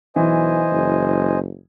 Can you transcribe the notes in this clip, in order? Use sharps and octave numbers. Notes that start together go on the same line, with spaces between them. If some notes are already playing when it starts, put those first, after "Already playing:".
B1 E3 C5 D#5 G#5
F#1